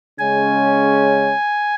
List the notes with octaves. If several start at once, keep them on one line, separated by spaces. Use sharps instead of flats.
C#3 G#3 C#4 G#5